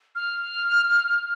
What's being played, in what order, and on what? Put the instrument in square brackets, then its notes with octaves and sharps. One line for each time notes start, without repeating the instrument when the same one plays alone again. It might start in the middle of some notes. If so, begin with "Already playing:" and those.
[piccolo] F6